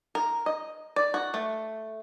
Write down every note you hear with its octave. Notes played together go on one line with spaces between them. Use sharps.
A#4
D#5
D5
F#4
A3